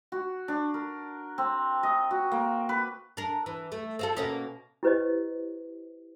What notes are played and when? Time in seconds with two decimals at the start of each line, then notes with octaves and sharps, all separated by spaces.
0.12 F#4
0.48 D4
0.74 A#4
1.38 C4
1.83 D#5
2.11 F#4
2.31 A#3
2.69 B4
3.17 D4 A#4
3.46 E3
3.72 A3
3.99 C4 F4 A4
4.17 B2 A#3 C#4
4.83 E4 G4 B4 C5 D5 D#5